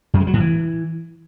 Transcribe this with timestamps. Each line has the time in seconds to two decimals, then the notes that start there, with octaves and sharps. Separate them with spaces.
0.14 F#2
0.20 G#3
0.27 F#3
0.33 A2
0.40 E3